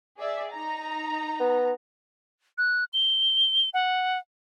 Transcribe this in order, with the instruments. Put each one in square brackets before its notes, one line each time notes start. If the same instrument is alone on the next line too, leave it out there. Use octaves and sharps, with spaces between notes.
[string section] G#4 D5 E5
D#4 A#5
[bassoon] B3
[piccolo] F#6
G7
F#5